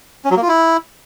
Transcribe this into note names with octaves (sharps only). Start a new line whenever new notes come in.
C#4
F#3
A#3
F4
E4